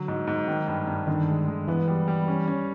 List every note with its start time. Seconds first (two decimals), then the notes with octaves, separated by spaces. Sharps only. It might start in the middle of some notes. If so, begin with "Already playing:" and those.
Already playing: D3 F#3
0.08 G#2
0.27 G#2
0.48 D#3
0.68 G2
0.87 G2
1.07 D3 D#3
1.28 G#3
1.48 G#3
1.68 E3 B3
1.88 G3
2.08 G3
2.28 C#4
2.47 C#4